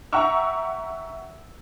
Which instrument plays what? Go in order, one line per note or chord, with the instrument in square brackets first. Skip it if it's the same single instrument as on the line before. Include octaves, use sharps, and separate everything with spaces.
[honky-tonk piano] E5 F#5 G5 A#5 C#6 E6